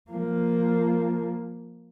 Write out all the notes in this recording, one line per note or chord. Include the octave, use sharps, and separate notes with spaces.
F3 A#3